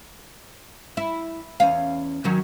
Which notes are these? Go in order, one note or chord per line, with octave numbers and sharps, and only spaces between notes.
E4
E2 C#4 F5
D#3 F#3 C#4